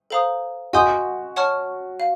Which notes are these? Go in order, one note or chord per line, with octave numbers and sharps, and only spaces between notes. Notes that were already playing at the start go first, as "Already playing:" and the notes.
A4 C5 F5 A#5 D#6
F#4 D#5 G#5 C6 D#6 G6
C#5 F#5 A5 C#6 F6
F5